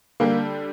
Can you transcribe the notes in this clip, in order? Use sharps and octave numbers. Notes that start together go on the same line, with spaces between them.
D3 G3 A#3 D4 G4